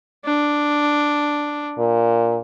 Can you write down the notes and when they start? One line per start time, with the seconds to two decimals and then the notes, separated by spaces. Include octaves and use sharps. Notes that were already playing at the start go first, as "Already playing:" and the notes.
0.25 D4
1.79 A#2